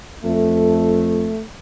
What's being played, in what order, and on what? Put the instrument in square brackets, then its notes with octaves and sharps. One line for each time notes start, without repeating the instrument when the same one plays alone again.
[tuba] F2 [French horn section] A3